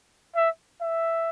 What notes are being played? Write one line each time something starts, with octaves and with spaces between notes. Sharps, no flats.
E5
E5